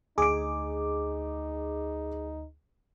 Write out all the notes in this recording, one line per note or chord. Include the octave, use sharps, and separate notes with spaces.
D2 D#4 G#4 D6 D7